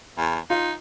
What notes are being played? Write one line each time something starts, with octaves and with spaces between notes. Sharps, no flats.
E2
D#4 F4